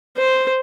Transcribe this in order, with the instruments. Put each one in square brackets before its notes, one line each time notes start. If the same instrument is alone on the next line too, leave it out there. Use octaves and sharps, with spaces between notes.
[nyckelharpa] C5